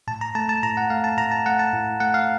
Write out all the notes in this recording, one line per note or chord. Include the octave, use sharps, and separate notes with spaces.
A2 A5
A#5
A3 A5
A5
A2 A#5
F#5
A3 F5
A5
A2 A#5
A5
A3 F#5
A5
A2
A3 F#5
F5